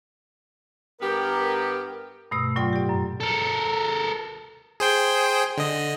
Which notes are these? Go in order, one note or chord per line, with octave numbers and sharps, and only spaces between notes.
G2 B3 G4 A#4
G2 B2 A3 E6
A2 F#3 F4 D5 G5 C6
G4 D5
F#2
A4 A#4
G#4 C5 G5
D3 D#5